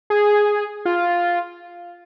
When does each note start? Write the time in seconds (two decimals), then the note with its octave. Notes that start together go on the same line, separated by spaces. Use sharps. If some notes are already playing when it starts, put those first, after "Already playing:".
0.10 G#4
0.85 F4